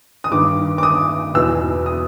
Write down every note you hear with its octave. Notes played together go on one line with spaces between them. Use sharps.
D#6
G2 D#3 D6
D6
D#6
E2 B2 E6
D#6